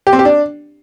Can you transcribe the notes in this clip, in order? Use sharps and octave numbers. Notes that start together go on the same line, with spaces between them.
G4
C4
G4
D4